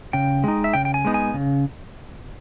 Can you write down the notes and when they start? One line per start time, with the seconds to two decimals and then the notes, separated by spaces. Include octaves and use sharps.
0.13 C#3 G5
0.44 G#3 D#4
0.64 E5
0.74 C#3 G5
0.85 G5
0.94 G#5
1.05 G#3 B3 D#4
1.14 G#5
1.34 C#3